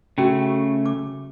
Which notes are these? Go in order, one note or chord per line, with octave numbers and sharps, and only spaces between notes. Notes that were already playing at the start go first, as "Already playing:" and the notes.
C#3 A3 C#4 F#4
D6